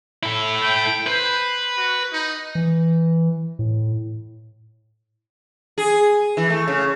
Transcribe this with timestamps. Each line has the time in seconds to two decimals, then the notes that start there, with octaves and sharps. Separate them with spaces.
0.23 E4 A4
0.63 G5
1.07 B4 C5
1.78 F#4
2.13 D#4
2.55 E3
3.59 A2
5.78 G#4
6.37 E3
6.50 A3
6.68 C#3